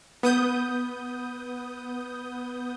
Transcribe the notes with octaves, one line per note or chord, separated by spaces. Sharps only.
B3 D#6 G6